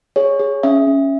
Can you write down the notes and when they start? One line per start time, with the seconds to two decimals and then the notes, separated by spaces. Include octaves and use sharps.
0.16 G#4 C#5
0.39 G#4
0.63 C#4 E5
0.87 C#4